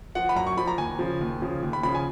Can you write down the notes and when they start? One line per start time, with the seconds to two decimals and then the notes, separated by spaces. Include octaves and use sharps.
0.15 F3 F#5
0.29 B5
0.36 F#2 A#5
0.47 C#6
0.57 F3 B5
0.67 A#5
0.78 D#2 G#5
0.99 C#3 F3
1.21 D#2
1.42 C#3 F3
1.63 D#2
1.73 B5
1.83 C#3 F3 B5
1.95 G#5